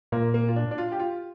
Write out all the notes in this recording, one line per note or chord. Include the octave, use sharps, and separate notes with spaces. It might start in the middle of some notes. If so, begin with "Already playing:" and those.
A#2 A#3
A#3
F4
D4
D4
F4
G4
F4